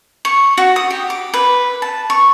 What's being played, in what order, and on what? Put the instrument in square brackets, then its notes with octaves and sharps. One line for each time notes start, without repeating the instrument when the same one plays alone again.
[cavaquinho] C#6
F#4
D#6
G4
D6
B4
A5
C#6